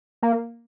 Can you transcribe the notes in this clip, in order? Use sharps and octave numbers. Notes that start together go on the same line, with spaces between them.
A#3